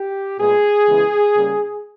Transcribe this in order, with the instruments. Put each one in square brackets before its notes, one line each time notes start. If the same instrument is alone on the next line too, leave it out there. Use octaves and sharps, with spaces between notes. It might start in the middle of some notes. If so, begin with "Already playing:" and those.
Already playing: [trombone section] G4
A#2 G#3 B3 G#4
C#3 E3 G#3 B3
C#3 G3 A#3